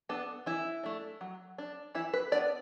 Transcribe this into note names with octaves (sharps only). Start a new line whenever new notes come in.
B3 D4 A4
E3 E4
A3 D4
F#3
D4
E3 E4
B4
B3 D4 D5